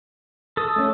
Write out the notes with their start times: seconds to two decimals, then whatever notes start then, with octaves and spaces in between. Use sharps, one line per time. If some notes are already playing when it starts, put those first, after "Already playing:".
0.57 A4 D#6
0.76 A3 C#4